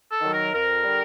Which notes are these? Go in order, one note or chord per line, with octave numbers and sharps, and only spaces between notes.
A4
D#3 F#3
A#4
F2 A#4
D3 G3